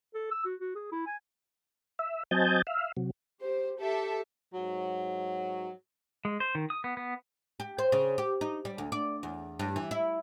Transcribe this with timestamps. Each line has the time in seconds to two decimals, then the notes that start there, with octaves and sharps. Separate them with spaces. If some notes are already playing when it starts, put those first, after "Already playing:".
0.15 A4
0.31 E6
0.45 F#4
0.61 F#4
0.75 G#4
0.92 E4
1.06 G#5
1.99 E5
2.31 F#3 C4 D#5 G#5 A5 G6
2.67 E5 F5
2.97 C3 F#3
3.42 G4 C5
3.78 G4 A4 E5
4.54 G#2 F#3
6.25 G#3
6.40 C5
6.55 D#3
6.70 D#6
6.84 B3
6.97 B3
7.60 G4
7.78 C5
7.92 C#3
8.18 G4
8.41 D#4
8.65 G3
8.78 D2
8.92 D5
9.23 E2
9.59 G2
9.76 E3
9.91 E4